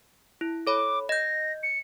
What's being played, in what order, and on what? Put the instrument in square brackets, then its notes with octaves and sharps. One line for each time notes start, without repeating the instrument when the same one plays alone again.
[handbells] E4
[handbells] A4 C#5 B5 [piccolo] D6
[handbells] D#5 G6 [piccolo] A#6
[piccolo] C#7